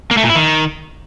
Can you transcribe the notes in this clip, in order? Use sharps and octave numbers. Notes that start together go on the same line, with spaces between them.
A#3
A3
A#2
E4
D#3